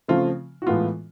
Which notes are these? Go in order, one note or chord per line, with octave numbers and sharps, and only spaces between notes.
C#3 F3 A3 C4 F4
F#4
A2 E3 G#3 B3 F4